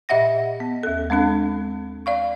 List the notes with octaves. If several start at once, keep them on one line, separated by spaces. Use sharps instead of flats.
A#2 D#5 E5 F#5 A#6
B3
D#2 A4
G#3 C4 D4 A4
D5 F5 C#6